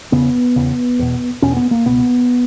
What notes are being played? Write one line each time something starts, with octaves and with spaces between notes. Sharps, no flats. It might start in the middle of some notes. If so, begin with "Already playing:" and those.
E2 C#3 B3
E2 C#3
E2 B2
E2 B2 C#4
B3
A#3
C#2 B2 B3